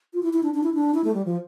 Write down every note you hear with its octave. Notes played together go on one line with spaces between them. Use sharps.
F4
E4
E4
D4
D4
E4
D4
E4
A3
G3
F3